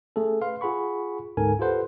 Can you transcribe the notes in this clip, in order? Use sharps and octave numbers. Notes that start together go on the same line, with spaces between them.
A3 C#4 G#4 A4
B4 F5 C6
F4 G#4 F#5 B5 C#6
D2 G#2 C#4 A4 A#4 G#5
F4 G4 A4 B4 C5 F#5